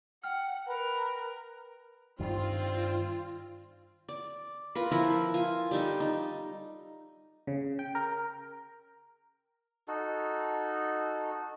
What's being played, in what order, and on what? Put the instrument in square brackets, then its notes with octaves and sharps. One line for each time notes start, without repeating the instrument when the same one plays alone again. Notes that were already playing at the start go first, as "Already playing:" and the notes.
[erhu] F#5 [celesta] G5 F6
[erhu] A#4 [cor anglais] B4
[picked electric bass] G2 D#3 [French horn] C4 [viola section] F4
[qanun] D5
F4 A#4 B4
F3 E4 A#4 B4
F4 G#5
G3 D#4 A4
D#4
[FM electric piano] C#3
G5
A#4
[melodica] D#4 F#4 A4